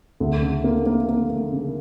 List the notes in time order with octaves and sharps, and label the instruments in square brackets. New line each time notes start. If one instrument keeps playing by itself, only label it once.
[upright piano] D2
C#3
A#3
A#3
A#3
A#3
C#3